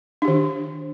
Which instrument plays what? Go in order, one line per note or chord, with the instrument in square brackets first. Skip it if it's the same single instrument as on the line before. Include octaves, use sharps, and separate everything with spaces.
[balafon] D4
G4
D#3